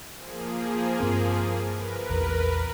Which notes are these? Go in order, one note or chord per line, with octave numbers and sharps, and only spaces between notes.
F3 A#3 G#4
G2 C4
A#4 B4
A#1 E2